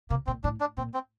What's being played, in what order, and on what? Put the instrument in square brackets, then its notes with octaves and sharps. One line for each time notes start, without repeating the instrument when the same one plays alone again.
[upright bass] C3 [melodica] A#3
[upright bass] A#2 [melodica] C4
[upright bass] A2 [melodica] D4
[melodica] D4
[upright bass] A#2 [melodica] C4
[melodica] C4